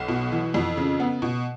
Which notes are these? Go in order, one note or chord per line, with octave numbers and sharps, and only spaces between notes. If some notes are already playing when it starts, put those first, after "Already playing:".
Already playing: B1
B2
E3
F2
C#3
B3
B2